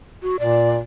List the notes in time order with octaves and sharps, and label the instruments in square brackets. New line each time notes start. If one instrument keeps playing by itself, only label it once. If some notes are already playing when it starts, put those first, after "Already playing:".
[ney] F#4
[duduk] A#2 [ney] D5